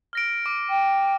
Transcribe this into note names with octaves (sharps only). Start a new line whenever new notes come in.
F6 A#6 D7
D6
G5